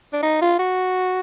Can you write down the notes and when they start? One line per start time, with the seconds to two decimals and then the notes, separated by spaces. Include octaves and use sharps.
0.13 D4
0.22 D#4
0.42 F4
0.59 F#4